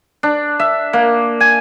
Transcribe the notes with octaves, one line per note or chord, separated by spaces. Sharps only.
D4
E5
A#3
G#5